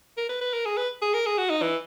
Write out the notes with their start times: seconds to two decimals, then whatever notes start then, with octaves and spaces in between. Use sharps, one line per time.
0.17 A#4
0.29 B4
0.41 B4
0.53 A#4
0.65 G#4
0.77 B4
1.02 G#4
1.14 A#4
1.26 G#4
1.38 F#4
1.50 D#4
1.62 E3